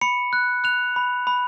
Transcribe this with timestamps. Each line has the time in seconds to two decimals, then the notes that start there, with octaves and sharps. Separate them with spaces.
0.01 B5 C#7
0.33 F#6
0.64 F#6 F7
0.96 B5
1.27 B5